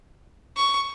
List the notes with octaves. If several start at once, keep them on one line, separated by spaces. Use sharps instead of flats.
C#6